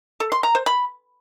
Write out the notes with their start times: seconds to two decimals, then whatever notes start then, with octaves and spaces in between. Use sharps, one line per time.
0.20 A4
0.32 C6
0.43 A#5
0.55 C5
0.66 B5